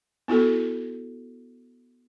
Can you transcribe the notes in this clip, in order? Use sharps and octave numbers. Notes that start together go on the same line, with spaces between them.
B3 E4 F#4 A4